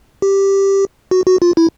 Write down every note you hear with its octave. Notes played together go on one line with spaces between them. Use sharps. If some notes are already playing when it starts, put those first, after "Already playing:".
G4
F#4
F#4
F4
E4